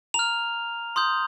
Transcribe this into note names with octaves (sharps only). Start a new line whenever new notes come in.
A#5 F6 F7
C6 D#6 G6